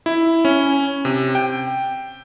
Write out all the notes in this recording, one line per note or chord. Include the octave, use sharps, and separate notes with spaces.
E4
C#4
C3
G5